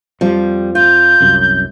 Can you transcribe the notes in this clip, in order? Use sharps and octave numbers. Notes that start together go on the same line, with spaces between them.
F2 F3 G3
F4 G6
C2 F#2